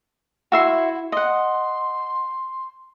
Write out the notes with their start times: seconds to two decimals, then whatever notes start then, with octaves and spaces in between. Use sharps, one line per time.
0.52 E4 F#4 E5 C6
1.12 D#5 F#5 C6